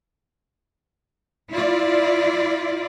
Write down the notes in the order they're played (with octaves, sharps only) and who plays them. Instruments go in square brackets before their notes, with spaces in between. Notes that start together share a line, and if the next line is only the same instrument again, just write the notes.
[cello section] E4 F4 D5